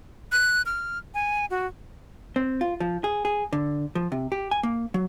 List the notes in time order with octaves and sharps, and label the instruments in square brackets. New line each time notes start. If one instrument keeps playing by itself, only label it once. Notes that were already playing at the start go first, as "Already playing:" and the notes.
[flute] F#6
F6
G#5
F#4
[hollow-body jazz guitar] C4
F4
F3
G#4
G#4
D3
F3
C3
G4
G#5
A#3
F#3